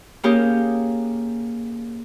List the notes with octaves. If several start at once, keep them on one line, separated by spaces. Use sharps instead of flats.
A#3 C#4 G4 G#4 A#4